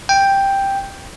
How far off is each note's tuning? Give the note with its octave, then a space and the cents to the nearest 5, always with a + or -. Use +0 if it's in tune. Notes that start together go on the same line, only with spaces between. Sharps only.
G5 +5